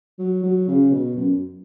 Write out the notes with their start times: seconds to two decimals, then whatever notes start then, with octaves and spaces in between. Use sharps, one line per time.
0.19 F#3
0.43 F#3
0.68 C#3
0.91 B2
1.16 F#2